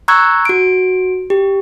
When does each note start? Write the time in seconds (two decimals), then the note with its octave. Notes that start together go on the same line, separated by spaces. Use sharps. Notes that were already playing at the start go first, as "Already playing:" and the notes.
0.08 A#5 C#6 E6 F#6 G#6
0.45 F#4 D7
1.30 G4